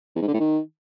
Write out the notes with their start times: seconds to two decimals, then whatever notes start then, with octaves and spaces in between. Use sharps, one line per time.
0.16 E2
0.22 G#2
0.28 D3
0.34 A2
0.40 D#3